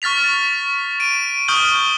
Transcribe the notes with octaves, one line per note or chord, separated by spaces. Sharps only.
C#6 F6 A6 B6 F7
D7 D#7
C#6 D#6 F6 G6 F#7 G7